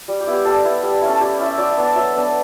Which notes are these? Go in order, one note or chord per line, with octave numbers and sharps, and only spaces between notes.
G3
G4
B3 E4
G4
G3 A4
B3 E4
G3
C#4 E4
A4
G3 G4
C#4 E4
E5
F#3 D5
E5
B3 D4
D5
F#3 E5
B3 D4